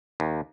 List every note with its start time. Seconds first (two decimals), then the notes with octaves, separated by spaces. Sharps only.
0.20 D#2